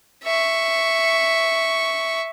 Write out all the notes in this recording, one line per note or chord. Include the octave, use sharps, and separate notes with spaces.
E5 C#6